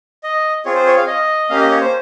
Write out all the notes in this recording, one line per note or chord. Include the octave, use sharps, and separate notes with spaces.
D#5
C4 F4 G#4 C#5
C5
C#5
F5
D#5
A#3 C#4 G4 F5
D#5
C#5
C5